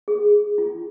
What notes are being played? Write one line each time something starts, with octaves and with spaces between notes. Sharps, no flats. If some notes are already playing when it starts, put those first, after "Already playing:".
G#4
F4